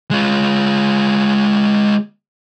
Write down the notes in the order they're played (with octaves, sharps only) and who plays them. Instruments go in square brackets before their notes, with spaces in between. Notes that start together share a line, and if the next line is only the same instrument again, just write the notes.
[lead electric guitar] G#3 F4